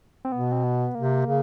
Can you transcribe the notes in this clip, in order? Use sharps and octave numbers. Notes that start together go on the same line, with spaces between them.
C4
B2 B3
C4
B3
C3 A#3
C#3